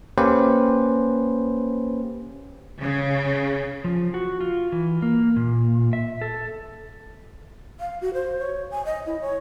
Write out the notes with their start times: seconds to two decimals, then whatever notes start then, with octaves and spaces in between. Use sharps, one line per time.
0.18 A#3 C#4 G4 B4 C5
2.80 C#3
3.84 F3
4.14 F#4
4.41 F4
4.72 E3
5.02 A#3
5.36 A#2
5.93 E5
6.21 A4
7.80 F5
8.01 F#4
8.14 C5
8.39 C#5
8.71 G#5
8.85 D#5
9.06 E4
9.21 C#5